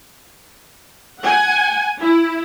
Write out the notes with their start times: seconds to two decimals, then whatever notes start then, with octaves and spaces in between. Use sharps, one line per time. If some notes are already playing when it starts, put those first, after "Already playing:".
1.19 F#5 G#5
2.00 E4